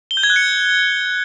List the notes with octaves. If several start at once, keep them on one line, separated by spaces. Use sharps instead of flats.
G7
G6
G#6
F#6
C#7